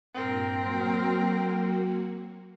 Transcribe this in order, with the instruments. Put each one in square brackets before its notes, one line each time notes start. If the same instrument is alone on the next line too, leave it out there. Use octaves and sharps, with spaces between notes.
[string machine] G2 A#2 G5 [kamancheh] C4 A#4
[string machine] F#3 A#3 F#4